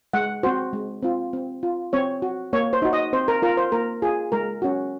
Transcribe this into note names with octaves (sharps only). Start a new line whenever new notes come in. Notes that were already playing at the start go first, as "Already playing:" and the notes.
G#3 F#5
C4 F#4 C5
G#3
C4 F4
C4
F4
C4 C#5
F#4
A#3 C#5
C5
D#4 F#4
D#5
C4 C5
A#4
F4 A#4
C5
A#3 A#4
F4 G#4
G#3 A#4
C#4 F#4